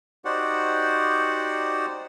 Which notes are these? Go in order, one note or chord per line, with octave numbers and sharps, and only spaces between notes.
D#4 F#4 G4 C5 D5 F#5